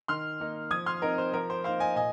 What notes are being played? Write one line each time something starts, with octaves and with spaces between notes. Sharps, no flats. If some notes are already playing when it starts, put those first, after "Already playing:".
D#3 C6 F6
A#3 D#4
F3 D#6 G#6
C6 F6
C4 D#4 A#4 D#5
C5
F3 A#4
C5
A#3 D#4 C5 F5
D#5 G#5
A#2 D#5 G#5